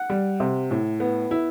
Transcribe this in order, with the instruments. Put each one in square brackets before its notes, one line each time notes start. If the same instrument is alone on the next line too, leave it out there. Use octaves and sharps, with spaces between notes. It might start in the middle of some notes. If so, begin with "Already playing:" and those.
Already playing: [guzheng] F#5
[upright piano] G3
C3
A2
B3
E4